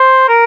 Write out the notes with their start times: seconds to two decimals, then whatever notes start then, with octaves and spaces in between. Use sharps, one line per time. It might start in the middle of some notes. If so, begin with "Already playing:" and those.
Already playing: C5
0.28 A#4